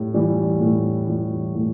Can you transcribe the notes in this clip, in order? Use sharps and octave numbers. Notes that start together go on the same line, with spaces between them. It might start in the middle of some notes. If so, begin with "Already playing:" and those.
Already playing: A2 G3
E3 G3
A2
E3 G3
A2